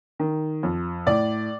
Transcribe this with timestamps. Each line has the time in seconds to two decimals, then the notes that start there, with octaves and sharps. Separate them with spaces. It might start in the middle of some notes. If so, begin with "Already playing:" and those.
0.19 D#3
0.63 F2
1.07 A2 D5